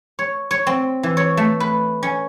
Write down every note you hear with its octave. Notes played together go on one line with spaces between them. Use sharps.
C#5
C#5
C4
E3
C#5
A3
B4
C#4